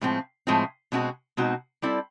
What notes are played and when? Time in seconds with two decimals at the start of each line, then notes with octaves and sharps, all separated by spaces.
0.01 A2 F3 G#3 C4
0.47 A2 F3 G#3 C4
0.92 B2 G#3 C4 D#4 F#4
1.37 B2 G#3 C4 D#4 F#4
1.82 G3 C4 E4 A4 D5